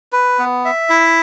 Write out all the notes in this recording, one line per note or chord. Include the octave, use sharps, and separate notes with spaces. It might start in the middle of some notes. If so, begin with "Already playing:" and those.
B4
B3
E5
E4